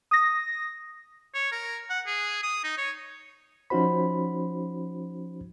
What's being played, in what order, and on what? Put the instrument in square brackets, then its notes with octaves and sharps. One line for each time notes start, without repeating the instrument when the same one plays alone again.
[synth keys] D#6 A#6
[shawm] C#5
A#4
F#5
G#4
D#6
D#4
C#5
[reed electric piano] F3 C#4 D#4 F#4 C5 B5